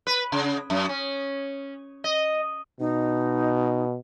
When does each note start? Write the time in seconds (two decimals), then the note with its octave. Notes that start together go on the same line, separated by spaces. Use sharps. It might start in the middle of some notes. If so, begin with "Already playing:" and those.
0.07 B4
0.32 C#3
0.70 F#2
0.89 C#4
2.04 D#5
2.80 B2 D#4